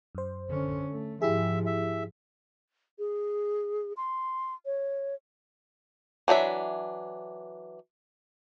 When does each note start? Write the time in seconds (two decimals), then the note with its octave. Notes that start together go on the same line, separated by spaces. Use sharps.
0.15 F#2 C5
0.49 D3 C#4
0.90 A3
1.22 G#2 F3 E4 G4 G#4 E5
1.66 E5
2.99 G#4
3.97 C6
4.66 C#5
6.28 E3 F#3 D4 E5